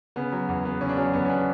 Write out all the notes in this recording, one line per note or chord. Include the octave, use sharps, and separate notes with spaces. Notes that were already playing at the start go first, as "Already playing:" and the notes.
C#3 B3
F#3
E2
B3
C#3 C#4
D4
F#3 C#4
E2 B3
C#4
B3 D4